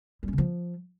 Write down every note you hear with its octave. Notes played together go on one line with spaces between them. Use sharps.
G3
C#4
C#3
F3